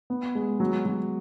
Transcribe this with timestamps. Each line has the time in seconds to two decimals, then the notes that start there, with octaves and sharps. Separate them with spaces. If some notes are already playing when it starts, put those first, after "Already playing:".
0.10 B3
0.35 G#3
0.60 F#3
0.86 F#3